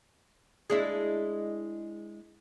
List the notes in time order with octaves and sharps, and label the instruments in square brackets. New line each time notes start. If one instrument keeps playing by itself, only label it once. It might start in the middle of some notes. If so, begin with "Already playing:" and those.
[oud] G#3 D4 E4